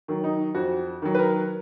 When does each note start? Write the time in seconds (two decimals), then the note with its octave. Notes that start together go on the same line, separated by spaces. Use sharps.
0.08 D#3 F#3
0.24 D#4
0.55 F2 F#4
1.02 D#3 F#3
1.15 B4
1.19 A#4